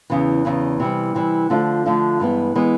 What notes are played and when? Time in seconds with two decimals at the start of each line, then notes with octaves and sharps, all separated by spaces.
0.10 E2 C#3 E3
0.45 E2 C#3 E3
0.80 C3 E3 G3
1.15 C3 E3 G3
1.50 D3 F3 A3 D4 F4
1.86 D3 F3 A3 D4 F4
2.20 G2 E3 G#3 B3
2.55 E3 G#3 B3